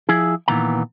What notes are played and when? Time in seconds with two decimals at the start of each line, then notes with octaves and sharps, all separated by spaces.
0.09 F3 E4 G#4
0.48 A#2 D#3 E3 B3 A#5